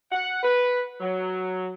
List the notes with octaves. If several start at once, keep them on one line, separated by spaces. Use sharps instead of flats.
F#5
B4
F#3